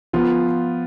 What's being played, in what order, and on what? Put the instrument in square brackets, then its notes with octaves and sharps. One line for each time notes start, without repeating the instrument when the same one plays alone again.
[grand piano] F3 B3 F4